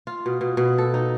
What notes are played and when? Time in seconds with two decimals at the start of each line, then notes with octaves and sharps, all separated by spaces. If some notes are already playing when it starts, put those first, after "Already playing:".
0.07 F4
0.26 B2
0.41 B2
0.57 B2
0.78 A4
0.94 D#4